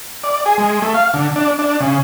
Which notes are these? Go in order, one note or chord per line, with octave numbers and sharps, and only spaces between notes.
D5
G#4
G#3
A3
F5
D3
D4
D4
C#3